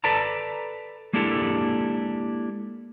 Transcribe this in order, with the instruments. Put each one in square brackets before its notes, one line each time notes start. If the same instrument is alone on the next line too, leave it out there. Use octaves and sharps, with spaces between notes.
[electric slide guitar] A4 B4 D5 A5 A#5
G#3 A#3 D4 E4 G4 A4